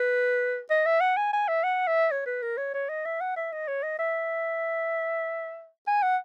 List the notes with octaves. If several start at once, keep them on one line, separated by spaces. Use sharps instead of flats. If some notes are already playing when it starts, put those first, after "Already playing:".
Already playing: B4
D#5
E5
F#5
G#5
G#5
E5
F#5
E5
C#5
B4
A#4
C#5
C#5
D#5
E5
F#5
E5
D#5
C#5
D#5
E5
G#5
F#5